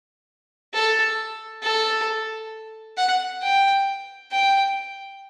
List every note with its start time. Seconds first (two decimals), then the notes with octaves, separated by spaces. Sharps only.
0.74 A4
1.63 A4
2.97 F#5
3.42 G5
4.32 G5